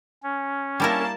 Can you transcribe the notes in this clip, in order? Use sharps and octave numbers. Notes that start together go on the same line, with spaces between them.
C#4
G3 A#3 E4 A#4 A5